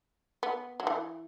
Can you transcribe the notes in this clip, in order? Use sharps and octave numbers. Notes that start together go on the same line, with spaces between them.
B3
F#3
E3